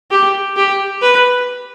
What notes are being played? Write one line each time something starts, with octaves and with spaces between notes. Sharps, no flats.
G4
G4
B4